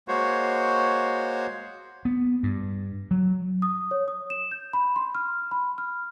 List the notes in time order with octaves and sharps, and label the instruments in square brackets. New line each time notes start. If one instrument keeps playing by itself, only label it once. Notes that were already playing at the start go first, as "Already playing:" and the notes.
[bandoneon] G#3 A#3 F#4 C5 C#5
[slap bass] B3
G2
F#3
[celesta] D#6
C#5
D#6
E7
G6
B5
C6
F6
B5
F6